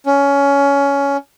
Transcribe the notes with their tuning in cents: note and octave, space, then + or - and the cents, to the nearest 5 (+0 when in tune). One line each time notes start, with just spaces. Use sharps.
C#4 +15